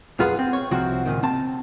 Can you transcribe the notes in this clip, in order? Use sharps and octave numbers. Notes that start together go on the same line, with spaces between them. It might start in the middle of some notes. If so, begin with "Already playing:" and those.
B1 F2 F4 G#4 B4 F#5
C4
C#5
C2 F3 C4 F#4
C#2 A#2 D#3
C4 A5